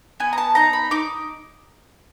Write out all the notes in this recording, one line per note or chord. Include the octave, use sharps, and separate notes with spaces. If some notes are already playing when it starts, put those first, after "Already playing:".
B3 G#5
A#5
A5
D#4 A#5
B5
D#4 D6